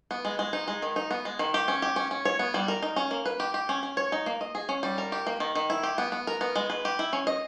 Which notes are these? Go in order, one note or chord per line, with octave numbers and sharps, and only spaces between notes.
B3
G#3
G#3
D#4
G#3
D#3
D#4
B3
G#3
D#3
G4
C#4
G4
C#4
C#4
C#5
B3
G3
A#4
D#4
C#4
A#3
B4
G4
G4
C#4
C#4
C#5
D#4
A#3
D#5
G#4
C#4
G3
A#4
G4
A#3
D#3
D#3
E4
G4
B3
B3
A#4
B3
G#3
B4
G4
E4
C#4
D#5